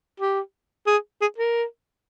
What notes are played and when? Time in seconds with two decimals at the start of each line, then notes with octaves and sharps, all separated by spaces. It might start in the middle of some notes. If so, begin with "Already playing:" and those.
0.20 G4
0.87 G#4
1.21 G#4
1.38 A#4